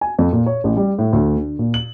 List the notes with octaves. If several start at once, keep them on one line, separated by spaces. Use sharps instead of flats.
G#5
F2
A#2
C#5
A1
G3
A2
D2
D3
A#2
F#7